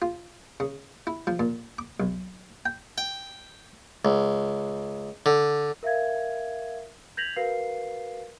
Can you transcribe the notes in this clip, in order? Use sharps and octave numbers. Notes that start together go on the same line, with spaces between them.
F4
C#3
E4
F3
A#2
D6
B1
G5
G5
C#2
D3
A#4 E5 F5 G#6
G6 G#6 A#6 B6 F7 F#7
F#4 A#4 B4 F5 C7